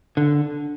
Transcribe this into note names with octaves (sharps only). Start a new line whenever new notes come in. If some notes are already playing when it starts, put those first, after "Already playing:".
D3